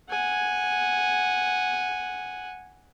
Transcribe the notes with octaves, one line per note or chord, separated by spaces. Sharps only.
F#5 G#5